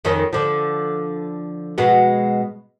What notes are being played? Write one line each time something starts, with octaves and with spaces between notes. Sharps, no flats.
F2 D#3 C#4
D3 F3
B2 G#3 B3